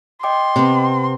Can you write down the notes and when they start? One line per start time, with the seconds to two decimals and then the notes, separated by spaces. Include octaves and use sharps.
0.23 D#5 G5 C6 D6
0.56 C3 B3